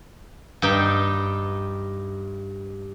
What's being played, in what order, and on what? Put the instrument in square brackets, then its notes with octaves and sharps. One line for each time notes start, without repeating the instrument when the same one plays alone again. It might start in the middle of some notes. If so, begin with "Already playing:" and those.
[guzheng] G2 D#4 G5